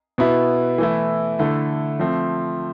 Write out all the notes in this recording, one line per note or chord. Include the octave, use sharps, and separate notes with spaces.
B2 B3 E4
E3 A3 E4
D3 A3 E4
F3 A3 C4